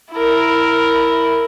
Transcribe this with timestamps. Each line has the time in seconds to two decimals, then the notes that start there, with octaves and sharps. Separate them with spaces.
0.13 E4 A#4